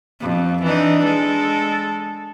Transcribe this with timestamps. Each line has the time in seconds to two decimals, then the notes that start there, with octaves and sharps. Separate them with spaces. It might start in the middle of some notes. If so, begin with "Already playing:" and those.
0.21 F2
0.63 E3 D4 D#4
1.04 G#3 A4